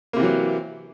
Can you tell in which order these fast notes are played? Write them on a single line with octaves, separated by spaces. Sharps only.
A#3 C3 E3 F#3